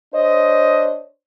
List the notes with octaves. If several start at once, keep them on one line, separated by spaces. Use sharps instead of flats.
D4 C5 C#5 D#5